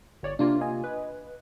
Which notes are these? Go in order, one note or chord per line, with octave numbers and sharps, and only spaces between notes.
G1 C#5 D5
C3 A#3 D4 F4
D#5 G#5
B4